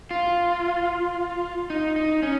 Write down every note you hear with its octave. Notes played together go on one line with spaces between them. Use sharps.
F4
D#4
D#4
C#4